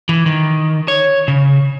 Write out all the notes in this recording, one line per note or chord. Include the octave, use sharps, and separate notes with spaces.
E3
D#3
C#5
C#3